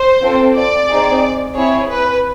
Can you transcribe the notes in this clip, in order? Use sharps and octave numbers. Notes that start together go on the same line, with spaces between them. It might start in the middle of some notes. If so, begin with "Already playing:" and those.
Already playing: C5
C4 F4 A4
D5
C4 D#4 G#4
C4 E4 G#4 C#5
B4